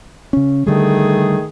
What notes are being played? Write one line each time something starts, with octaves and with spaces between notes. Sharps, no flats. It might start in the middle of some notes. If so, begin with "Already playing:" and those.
C#3 C#4
D3 D#3 G3 A3 G#4